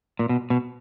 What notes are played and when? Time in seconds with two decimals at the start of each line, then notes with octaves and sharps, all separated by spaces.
0.19 A#2
0.29 B2
0.50 B2